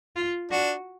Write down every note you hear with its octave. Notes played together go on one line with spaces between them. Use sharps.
F4
D4 F#4